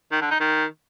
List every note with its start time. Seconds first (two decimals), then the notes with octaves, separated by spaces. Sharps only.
0.12 D#3
0.21 D3
0.31 D#4
0.40 D#3